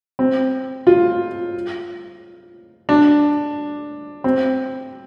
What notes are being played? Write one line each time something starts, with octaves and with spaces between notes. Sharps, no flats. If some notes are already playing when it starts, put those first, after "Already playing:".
C4
F4
D4
C4